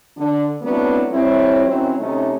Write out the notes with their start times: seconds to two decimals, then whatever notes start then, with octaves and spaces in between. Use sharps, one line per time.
0.17 D3 D4
0.62 F#3 A3 B3 C4 D4 E4
1.10 G3 C4 E4 A4 C#5
1.65 D#3 F#3 C4 C#4 E4
1.98 C3 A3 C#4 D#4